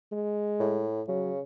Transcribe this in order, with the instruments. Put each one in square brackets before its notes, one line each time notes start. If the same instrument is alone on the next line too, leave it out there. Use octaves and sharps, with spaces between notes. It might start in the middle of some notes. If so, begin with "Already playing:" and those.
[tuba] G#3
[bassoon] A2
[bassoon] C#3 [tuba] F#3